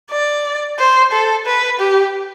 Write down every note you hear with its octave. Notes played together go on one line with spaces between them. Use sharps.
D5
C5
A4
B4
G4